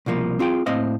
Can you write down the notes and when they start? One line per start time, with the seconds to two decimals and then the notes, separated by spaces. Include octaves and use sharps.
0.06 C2 B2 F3 A#3
0.39 C4 F4 G#4 G5
0.66 A2 A#3 C4 D#5 F5